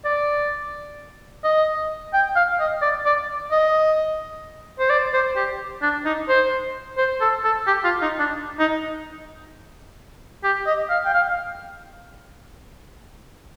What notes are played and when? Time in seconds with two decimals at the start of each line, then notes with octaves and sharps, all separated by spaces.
0.05 D5
1.44 D#5
2.14 G5
2.36 F5
2.60 D#5
2.82 D5
3.05 D5
3.51 D#5
4.80 C5
4.90 D5
5.14 C5
5.36 G4
5.82 D4
6.05 D#4
6.29 C5
6.98 C5
7.21 A4
7.44 A4
7.67 G4
7.84 F4
8.02 D#4
8.19 D4
8.59 D#4
10.44 G4
10.67 D#5
10.90 F5
11.06 G5
11.14 F5